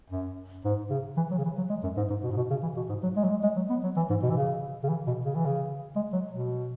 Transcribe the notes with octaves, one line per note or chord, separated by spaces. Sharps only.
F#2
G#2
C#3
E3
F#3
C#3
E3
F#3
G#3
F#2
G#2
G#2
B2
G#2
B2
C#3
E3
B2
G#2
F#3
G#3
F#3
G#3
G#3
F#3
B3
F#3
E3
G#2
B2
E3
C#3
C#3
E3
B2
C#3
E3
C#3
G#3
F#3
B2